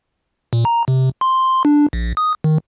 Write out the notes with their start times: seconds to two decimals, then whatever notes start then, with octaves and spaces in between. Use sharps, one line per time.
0.53 A#2
0.65 A#5
0.88 C3
1.21 C6
1.65 D4
1.93 A#1
2.17 D#6
2.44 D#3